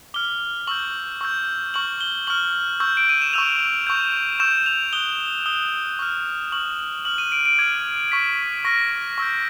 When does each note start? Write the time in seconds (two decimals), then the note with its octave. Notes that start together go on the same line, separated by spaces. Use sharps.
0.14 D6 F6 G7
0.67 C#6 E6 G6 F#7
1.21 C#6 E6 G6
1.74 C#6 F6 F#7
2.01 G7
2.27 C#6 F6 F#7
2.80 C#6 E6 G6
2.97 D7
3.09 D#7
3.22 E7
3.33 C#6 E6 G6 F7
3.87 C#6 E6 G6
4.40 C#6 E6 G6 E7
4.66 F7
4.93 D#6 F#6 G7
5.46 D#6 F#6 G7
5.99 C#6 F6
6.52 C#6 F6 F#7
7.05 D6 F6 F#7
7.18 D#7
7.32 D7
7.46 D7
7.59 D6 F6 G#6
8.12 C#6 F6 B6
8.65 C#6 F6 A#6
9.18 C#6 E6 G6